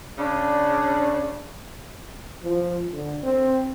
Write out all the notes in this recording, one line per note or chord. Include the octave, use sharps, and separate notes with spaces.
C#3 D4 D5
F3
D3
C4